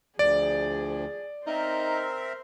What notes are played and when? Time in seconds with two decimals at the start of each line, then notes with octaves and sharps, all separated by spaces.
0.19 D2 F3 G#4 D5
1.47 C4 D#4 A#4 C5 E5